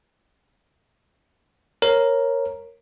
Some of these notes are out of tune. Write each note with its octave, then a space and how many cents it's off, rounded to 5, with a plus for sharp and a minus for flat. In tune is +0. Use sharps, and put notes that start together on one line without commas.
A#4 +0 C#5 -15